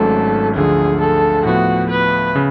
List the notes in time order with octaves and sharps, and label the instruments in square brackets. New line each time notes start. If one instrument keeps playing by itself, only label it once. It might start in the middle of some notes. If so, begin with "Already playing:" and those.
Already playing: [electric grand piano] G#1 G#2 F#3 A3 C#4 [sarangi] A4
[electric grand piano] D2 D3 F3 [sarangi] G#4
[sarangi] A4
[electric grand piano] A2 F3 B3 [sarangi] F#4
[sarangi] B4
[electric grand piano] C#3